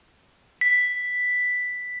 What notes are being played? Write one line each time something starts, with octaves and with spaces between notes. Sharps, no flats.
B6